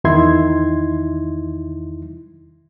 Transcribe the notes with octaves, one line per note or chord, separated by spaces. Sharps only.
E2 D#3 D#4 E4 C6 G#6